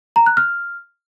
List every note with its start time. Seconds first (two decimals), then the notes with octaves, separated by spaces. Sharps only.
0.16 A#5
0.26 F#6
0.37 F6